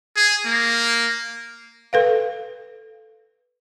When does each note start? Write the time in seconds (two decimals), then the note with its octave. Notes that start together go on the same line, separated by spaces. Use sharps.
0.16 G#4
0.46 A#3
1.93 A4 B4 F5